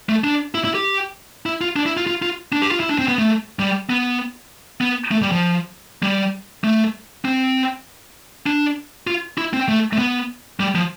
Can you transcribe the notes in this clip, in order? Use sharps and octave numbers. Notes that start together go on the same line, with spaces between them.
A3
D4
E4
E4
G4
E4
F4
D4
E4
F4
F4
F4
D4
G4
F4
E4
D4
C4
B3
A3
G3
B3
B3
A3
G3
F3
G3
A3
C4
D4
F4
E4
C4
A3
A3
B3
G3
F3